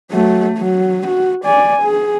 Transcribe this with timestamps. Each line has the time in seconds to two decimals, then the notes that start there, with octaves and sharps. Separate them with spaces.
0.12 F#3 A3
0.58 F#3
1.07 F#4
1.45 D5 G#5
1.83 G#4